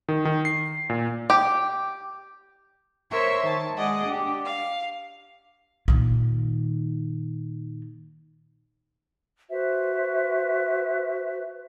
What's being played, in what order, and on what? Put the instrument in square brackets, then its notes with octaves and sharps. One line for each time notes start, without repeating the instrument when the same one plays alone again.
[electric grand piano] D#3
D#3
C7
A#2
[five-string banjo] G4
[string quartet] A#4 C5 C#5 E5 C#6
D#3 A5
G#3 G#4 D5 D#5 F#5
D4 G4
F5
[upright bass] A#2 D#3
[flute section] F#4 B4 C5 E5